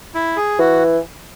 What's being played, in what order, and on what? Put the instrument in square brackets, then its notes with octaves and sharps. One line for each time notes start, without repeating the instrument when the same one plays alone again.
[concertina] E4
G#4
[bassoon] E3 [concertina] F#4